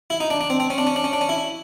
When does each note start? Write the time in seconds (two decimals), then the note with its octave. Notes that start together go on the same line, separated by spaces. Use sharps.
0.10 E4
0.20 D#4
0.30 D4
0.41 D4
0.50 C4
0.60 C4
0.70 C#4
0.78 D4
0.87 C#4
0.96 D4
1.04 C#4
1.13 D4
1.21 C#4
1.29 E4